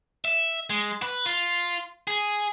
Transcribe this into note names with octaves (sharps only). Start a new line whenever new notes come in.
E5
G#3
B4
F4
G#4